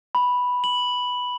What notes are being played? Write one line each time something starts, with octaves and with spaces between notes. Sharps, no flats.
B5
F#7